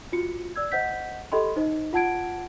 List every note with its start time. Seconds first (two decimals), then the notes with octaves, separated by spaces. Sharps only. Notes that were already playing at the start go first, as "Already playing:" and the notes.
0.12 F4 F#4 C#7
0.56 D5 E6 G#6
0.72 C5 D#5 F#5 G6 B6
1.32 G4 A4 D#5 G5 B5 C6
1.56 D#4 C5 D#5
1.93 F4 F#5 A5 G#6 D7